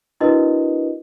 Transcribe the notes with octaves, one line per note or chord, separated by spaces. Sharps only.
D4 E4 F#4 A#4 B4 D#5